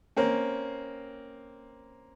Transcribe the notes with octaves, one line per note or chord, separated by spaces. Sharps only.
A#3 C4 C#4